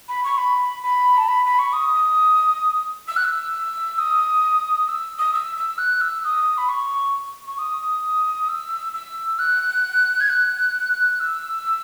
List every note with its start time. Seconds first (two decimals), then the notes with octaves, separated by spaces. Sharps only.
0.09 B5
0.24 C#6
0.38 B5
0.83 B5
1.18 A5
1.28 B5
1.46 B5
1.59 C#6
1.73 D#6
3.08 E6
3.17 F#6
3.24 E6
3.99 D#6
4.88 E6
5.19 D#6
5.34 E6
5.57 E6
5.78 F#6
6.01 E6
6.24 D#6
6.58 B5
6.69 C#6
7.46 C#6
7.58 D#6
8.49 E6
8.94 E6
9.39 F#6
10.21 G#6
10.29 F#6
11.20 E6